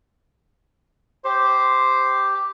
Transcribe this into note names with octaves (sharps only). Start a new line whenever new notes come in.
G4 C5